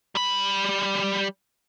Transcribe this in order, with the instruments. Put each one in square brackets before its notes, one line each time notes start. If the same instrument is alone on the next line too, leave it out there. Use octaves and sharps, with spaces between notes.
[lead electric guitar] G3 B5